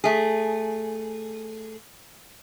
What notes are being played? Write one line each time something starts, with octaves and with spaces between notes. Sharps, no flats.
A3 G#4